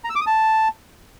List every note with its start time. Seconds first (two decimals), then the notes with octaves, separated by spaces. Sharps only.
0.04 A#5
0.10 E6
0.15 D6
0.21 D#6
0.27 A5